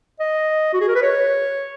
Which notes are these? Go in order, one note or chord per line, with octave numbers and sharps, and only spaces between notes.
D#5
F#4
G#4
A#4
B4
C#5